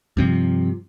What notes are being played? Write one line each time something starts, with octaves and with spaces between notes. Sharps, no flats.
G2 C3 F3